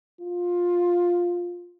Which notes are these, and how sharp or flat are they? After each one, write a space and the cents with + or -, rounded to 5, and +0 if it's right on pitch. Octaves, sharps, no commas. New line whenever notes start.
F4 +10